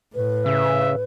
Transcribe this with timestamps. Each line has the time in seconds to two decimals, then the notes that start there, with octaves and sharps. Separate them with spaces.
0.15 A2 B4
0.46 C#3 E5